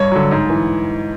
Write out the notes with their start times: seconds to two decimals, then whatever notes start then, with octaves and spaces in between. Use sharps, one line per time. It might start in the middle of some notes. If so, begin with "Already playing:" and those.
Already playing: G2 C#5
0.12 D3 F#3
0.31 G#2
0.50 E3